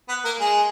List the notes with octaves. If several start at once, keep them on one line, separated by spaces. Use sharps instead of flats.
B3 B4
A#3 A#4
G#3 G#4